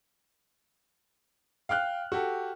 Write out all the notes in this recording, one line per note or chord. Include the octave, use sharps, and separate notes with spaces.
F5 G5 F6 F#6
F#4 G4 A4